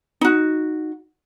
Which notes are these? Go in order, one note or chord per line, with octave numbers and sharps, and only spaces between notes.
D#4 F#4